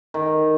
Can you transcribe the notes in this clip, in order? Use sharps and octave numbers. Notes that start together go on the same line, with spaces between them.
D#3